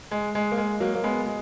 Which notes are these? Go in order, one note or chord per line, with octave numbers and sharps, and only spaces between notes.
G#3
G#3
A#3
G#3
F#3 A#3
A#3
G#3 B3
G#3